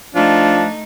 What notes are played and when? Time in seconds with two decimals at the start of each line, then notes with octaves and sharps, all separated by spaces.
0.15 F3 A3 D4 D#4